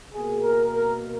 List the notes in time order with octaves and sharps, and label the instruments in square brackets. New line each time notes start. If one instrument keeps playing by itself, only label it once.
[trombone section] B2 A#3 G#4
A#4
A#4